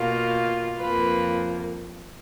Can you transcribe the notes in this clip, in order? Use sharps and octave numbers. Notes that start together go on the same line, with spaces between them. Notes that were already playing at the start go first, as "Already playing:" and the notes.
Already playing: B2 A#3 F4
F2 F3 A#3 B4